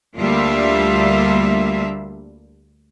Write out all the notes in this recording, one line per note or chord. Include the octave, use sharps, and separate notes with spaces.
D2 G3 A#3 D4 F4 E5